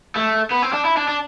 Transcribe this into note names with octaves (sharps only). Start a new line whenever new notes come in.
A3
B3
C4
D4
E4
D4
D4